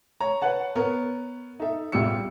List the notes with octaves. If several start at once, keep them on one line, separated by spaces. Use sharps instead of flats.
C#5 A#5
B4 C#5 F#5 A5
B3 A#4 C#5
D#4 A4 E5
A1 E2 G3 F4 E6 C#7